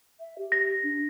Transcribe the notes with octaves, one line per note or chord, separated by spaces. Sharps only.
E5
G4
A#6
D4